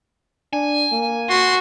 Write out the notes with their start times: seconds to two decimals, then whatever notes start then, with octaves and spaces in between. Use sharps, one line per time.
0.53 D4 G#5
0.92 A#3
1.30 F#4 C6